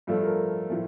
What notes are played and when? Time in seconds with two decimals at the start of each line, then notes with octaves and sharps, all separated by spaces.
0.07 G2 F3 A3 A4
0.23 A#4
0.70 A2 F3 A3